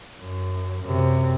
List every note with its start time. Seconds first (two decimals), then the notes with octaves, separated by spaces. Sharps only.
0.20 F#2
0.82 F#2 C3